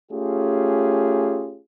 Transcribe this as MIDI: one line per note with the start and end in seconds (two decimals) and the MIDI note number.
0.11 1.59 57
0.11 1.59 61
0.11 1.59 65
0.11 1.59 67
0.11 1.59 68